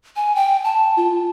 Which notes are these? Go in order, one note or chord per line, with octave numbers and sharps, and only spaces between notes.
G#5
G5
A5
F4